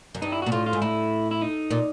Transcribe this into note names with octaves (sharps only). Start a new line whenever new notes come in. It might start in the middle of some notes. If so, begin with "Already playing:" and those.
F#2
G2 D#4
E4
A#2 F#4
A2 F4
F4
G#2
A2 E4
E4
D#4
A#2